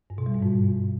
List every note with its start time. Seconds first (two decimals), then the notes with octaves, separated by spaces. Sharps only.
0.10 G2
0.18 B2
0.26 G3
0.34 G2
0.42 G#2